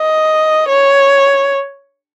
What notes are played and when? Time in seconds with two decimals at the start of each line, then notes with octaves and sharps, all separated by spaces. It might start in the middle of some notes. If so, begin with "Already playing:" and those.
Already playing: D#5
0.69 C#5